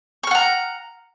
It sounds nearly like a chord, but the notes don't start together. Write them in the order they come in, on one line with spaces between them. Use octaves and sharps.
C#6 F6 F#5 A#5